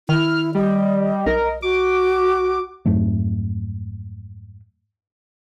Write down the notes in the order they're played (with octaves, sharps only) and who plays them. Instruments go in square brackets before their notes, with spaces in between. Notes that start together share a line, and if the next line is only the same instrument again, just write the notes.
[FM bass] D#3 [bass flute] E4 [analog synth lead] F6
[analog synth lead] G3 [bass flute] D#5
[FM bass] B1 [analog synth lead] A#4
[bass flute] F#4 [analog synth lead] D6
[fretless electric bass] F2 G#2 F#3 A3